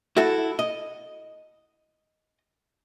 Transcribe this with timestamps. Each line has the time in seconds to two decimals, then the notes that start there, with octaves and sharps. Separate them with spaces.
0.17 E4 F#4 A4
0.59 D#5